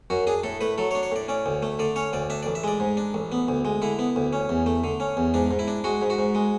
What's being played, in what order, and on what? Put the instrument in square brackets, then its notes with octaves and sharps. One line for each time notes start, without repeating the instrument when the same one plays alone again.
[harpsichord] F#2 F#4
D4 G#4
A2 A4
A3 B4
F#3 A4
C#5
D4
C#5
A2 D5
C#4 D5
D2
A3
D3 D5
C#4 C#5
D2 D5
D4 E5
A1 D5
E5
G#3 D5
G#2
D4
A1
B3
D2
G#3
D3 E4
B3
D2
C#4
E2
A3
D3
C#4
E2
G#2 D4
G#2
E4
D4
G#3 F#4
G#2
F#4
G#2
G#3